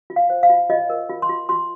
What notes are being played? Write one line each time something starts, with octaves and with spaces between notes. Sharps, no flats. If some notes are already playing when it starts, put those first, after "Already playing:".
F4
F5
C5
F5
F4
F4 D#5
A#4
F4
C6
F4
F4 C6